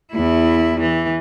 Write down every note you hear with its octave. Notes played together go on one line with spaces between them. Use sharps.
E2 E4
E3